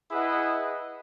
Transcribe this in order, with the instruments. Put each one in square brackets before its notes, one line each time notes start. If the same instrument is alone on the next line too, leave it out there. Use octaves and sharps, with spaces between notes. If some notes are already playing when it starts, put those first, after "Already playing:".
[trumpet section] E4 G#4 B4 D#5 F#5